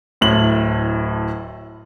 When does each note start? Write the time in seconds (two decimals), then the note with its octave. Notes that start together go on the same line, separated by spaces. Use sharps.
0.21 D1 A2 F#7